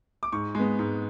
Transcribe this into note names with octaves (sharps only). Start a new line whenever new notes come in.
D6
G#2 C#6
G#3 B3
G#2